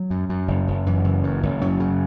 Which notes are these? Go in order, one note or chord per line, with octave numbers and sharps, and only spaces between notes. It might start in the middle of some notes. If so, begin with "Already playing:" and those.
Already playing: F#3
F#2
F#2
F#1
F#1
F#2 E3
F#1
F#2
F#1
F#2 F#3
C#3